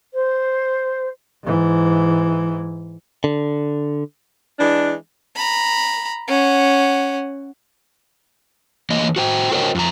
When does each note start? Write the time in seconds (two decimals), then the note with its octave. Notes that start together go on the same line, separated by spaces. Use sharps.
0.13 C5
1.44 G#2 E3
3.24 D3
4.59 E3 G#3 D4
5.36 A#5 B5
6.28 C#4 F#5
8.90 E3 A#3 D#5
9.16 F#4 C5 G5
9.51 F#4 A#4 C5 C#5 D#5 G5
9.75 F2 A#5